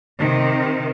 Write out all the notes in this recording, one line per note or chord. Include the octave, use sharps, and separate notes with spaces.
C3 D#3